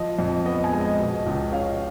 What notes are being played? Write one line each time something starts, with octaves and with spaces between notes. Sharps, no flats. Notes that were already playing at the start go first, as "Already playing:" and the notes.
Already playing: F3 D#5
F2
B3 D#5
G#5
G#3
D#5
B2
C#2
C#4 F5